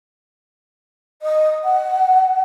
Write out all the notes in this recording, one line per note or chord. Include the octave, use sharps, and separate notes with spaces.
D#5
F#5